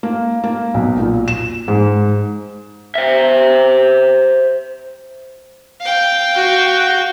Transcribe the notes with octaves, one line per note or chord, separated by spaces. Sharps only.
A#3
A#3
B1
A#2
E7
G#2
C5 E5
F5 G5
F#4